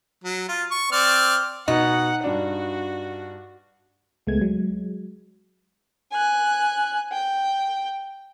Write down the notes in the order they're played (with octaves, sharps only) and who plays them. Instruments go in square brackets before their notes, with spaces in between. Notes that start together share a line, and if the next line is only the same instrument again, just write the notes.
[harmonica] F#3
F4
C#6
C4 D5 F6
[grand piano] B2 [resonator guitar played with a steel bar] D#4 [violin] F#5
[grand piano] G2 D4 [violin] F#4
[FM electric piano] C#2 G#3 A3 B3 G#6
F#3 G#3
[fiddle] G#5 F#6
G5